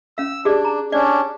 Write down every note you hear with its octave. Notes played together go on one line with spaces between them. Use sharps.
C#4 F5 E6
D4 G4 G#4 D5
A#5
C#4 D4 D5